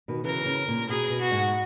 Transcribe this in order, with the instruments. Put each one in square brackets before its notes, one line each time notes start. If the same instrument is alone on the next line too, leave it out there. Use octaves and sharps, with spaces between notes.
[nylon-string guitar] B2 D#3
[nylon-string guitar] C#3 E3 [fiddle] A#4
[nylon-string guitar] C#3
A#2
[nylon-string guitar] B2 [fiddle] G#4
[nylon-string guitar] B2
[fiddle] F#4
[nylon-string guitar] G#2